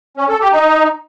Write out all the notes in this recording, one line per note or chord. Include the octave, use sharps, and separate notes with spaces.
C#4
A4
G4
D#4